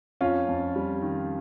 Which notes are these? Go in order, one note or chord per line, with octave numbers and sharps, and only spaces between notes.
F2 C#4 F4
F2
G3
D#3